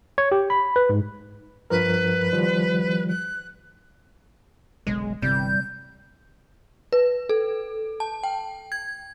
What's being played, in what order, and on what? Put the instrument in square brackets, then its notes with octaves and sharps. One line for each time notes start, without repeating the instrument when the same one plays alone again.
[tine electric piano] C#5
G4
B5
B4
G#2
[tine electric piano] G2 F3 A#4 [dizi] B4
[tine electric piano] D#3 F3 G3
[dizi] F#6
[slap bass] F#1 B1 D3 [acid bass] G#3
[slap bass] G1 E3 [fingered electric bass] C3 [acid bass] G3 [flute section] G6
[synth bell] B4
A4
A5
G5
G#6